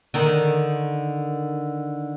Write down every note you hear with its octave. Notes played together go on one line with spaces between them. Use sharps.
D3 D#3